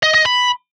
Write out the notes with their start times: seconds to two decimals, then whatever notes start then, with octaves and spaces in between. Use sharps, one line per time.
0.03 D#5
0.14 D#5
0.26 B5